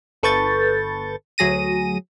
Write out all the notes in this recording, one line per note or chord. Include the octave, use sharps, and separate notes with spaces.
G1 A4 B4 C#6 G6 A6
D2 F#3 G#4 A#6 D#7